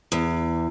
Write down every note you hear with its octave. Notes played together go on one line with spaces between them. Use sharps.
E2